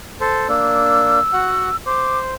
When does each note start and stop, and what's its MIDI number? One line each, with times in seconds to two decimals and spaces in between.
0.21 0.47 69
0.21 0.47 72
0.49 1.19 58
0.49 1.19 62
0.49 1.76 88
1.33 1.69 66
1.33 1.69 78
1.86 2.34 72
1.86 2.18 86